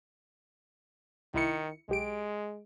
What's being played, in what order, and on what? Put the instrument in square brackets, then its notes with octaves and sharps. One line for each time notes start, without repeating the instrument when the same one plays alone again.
[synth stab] C2 E4 C#7 [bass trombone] D#3
[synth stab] B1 G4 D7 [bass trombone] G#3